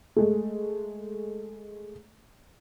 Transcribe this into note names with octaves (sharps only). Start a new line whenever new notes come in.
G#3 A3